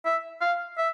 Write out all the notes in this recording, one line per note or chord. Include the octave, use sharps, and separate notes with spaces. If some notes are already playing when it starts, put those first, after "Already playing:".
E5
F5
E5